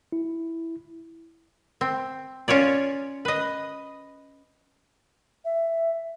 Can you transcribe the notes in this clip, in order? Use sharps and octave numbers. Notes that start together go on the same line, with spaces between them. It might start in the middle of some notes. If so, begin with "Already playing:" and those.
E4
C4
C#4 F4 C#5 D5
B4 D#5
E5